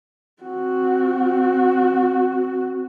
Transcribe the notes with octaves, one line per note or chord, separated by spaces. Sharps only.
C4 F#4